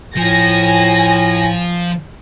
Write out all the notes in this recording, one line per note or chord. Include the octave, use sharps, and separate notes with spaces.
A2 F3 G#5 A#6